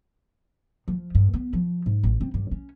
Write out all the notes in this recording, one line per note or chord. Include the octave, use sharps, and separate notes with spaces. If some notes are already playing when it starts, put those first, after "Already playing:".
F3
G2
B3
F3
G#2
A1
C4
G2
C#4